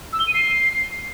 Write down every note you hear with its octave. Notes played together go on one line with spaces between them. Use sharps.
E6
G7
D#7
C7